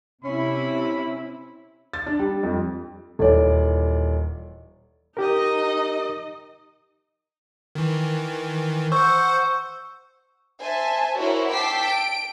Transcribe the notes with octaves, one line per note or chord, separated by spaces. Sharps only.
C3 C#4 E4 B5
A6
D4
G3
F2
D#1 E3 A4 C#5 D5
D#4 G4 A#4 D#5
D#3 E3
C5 F#5 C#6 E6 G6
C5 E5 G#5 A5
E4 F#4 A#4 C5 C#5
G5 A5 D6 E6 B6 C7
D7